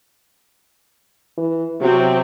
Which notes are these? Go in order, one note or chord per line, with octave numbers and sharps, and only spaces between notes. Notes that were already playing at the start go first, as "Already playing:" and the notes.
E3
C3 F#3 C4